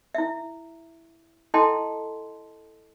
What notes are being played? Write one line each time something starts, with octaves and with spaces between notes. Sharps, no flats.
E4 E5
E4 A4 D#5 G5 A5 C6